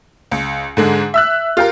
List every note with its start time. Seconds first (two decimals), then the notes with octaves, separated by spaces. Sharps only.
0.31 C#2
0.77 G#2 D3 G#3
1.14 E5 E6 F#6
1.57 F4 G4 A#4